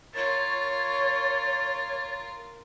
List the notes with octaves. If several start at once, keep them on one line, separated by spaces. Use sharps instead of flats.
F4 A#4 C#5 A6